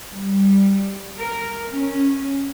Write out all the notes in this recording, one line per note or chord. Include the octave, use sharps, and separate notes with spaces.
G3
A#4
C#4